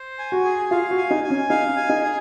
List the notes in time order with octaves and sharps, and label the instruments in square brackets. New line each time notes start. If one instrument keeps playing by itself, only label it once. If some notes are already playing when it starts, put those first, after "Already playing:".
Already playing: [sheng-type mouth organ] C5
G#5
[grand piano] F#4
[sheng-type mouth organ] G#4
[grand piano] F4 [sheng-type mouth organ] F5
[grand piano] F#4
[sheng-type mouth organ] G#5
[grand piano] D#4
[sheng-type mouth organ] G#5
[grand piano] C#4
[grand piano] D#4 [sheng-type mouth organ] F5
[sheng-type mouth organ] G#5
[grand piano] D#4
[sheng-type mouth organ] G#4